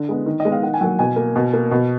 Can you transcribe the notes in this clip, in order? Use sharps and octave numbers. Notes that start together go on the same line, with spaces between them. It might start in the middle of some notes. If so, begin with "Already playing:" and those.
Already playing: D3
G#3 B3
D#3
D#5
G#3 B3
F5
D#3 F#5
G#5
F#3 A#3 F#5
B2 G#5
A#3
B2
A#3
B2